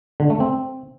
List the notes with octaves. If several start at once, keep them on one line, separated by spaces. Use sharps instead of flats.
D3
A3
C4